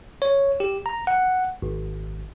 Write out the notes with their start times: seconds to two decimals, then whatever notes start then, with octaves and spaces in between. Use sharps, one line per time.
0.22 C#5
0.60 G4
0.86 A#5
1.07 F#5
1.62 G#1